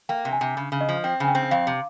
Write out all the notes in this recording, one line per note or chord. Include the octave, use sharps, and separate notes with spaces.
A#3 G5
C3
G#5
C3
C#3
C#3
D#5
F3
C4 G5
C#3 G#5
G5
C4
G5
F2 F5
C3